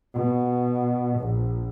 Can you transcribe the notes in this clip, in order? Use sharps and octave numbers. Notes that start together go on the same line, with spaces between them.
B2
A#1